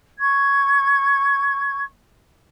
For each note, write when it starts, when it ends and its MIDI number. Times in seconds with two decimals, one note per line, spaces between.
0.19 1.83 85
0.19 1.83 92